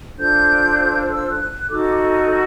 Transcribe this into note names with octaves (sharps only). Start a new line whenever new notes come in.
D4 F4 A4 C5 G6
E6
F#6
D#4 F#4 A4 D6